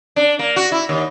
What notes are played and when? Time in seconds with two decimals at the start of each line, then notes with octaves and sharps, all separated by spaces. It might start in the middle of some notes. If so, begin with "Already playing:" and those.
0.16 D4
0.39 A#3
0.56 F#4
0.72 E4
0.89 D#2